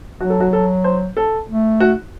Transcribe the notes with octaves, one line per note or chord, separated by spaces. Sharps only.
F#3 F#4
A4
F#4
A4
C5
A4
A3
F#4